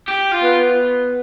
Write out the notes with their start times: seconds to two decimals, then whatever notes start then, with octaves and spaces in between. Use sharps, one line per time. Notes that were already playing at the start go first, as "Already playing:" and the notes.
0.08 G4
0.32 F4
0.43 B3